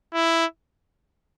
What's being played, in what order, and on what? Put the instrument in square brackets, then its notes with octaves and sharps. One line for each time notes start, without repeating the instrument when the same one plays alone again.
[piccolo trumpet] E4